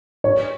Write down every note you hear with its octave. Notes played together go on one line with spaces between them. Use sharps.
C#5